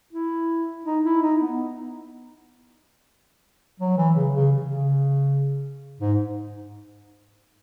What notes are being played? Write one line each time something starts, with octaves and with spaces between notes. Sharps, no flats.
E4
D#4
E4
D#4
B3
F#3
E3
C#3
C#3
C#3
G#2